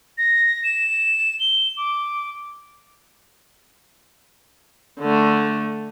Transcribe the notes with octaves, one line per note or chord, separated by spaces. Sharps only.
A#6
E7
G7
D6
D3 A3